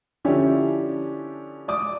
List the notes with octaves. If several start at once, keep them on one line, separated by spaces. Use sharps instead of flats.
D3 F3 C#4 D4 E4 G4
D5 D6 D#6